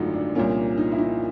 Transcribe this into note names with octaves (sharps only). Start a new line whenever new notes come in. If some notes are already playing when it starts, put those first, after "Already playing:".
Already playing: G#1 F#2 D3 F3 A3 D#4 F4 F#4
D4
C2 A#2 F3 A#3 C#4
D#4
E4
D#4